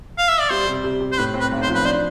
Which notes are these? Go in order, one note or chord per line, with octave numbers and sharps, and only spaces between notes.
F5
E5
D5
G3 C5
C3
C3
C3
C5
A2 B4
C4
B4
B1
C5
F3
B4
D4 C5